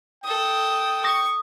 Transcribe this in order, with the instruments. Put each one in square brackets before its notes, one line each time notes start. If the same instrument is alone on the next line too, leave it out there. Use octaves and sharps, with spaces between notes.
[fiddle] A4 D#6 [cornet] G5
[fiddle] C#6 [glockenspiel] D#6 A#6